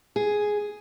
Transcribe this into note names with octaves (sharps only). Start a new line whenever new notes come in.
G#4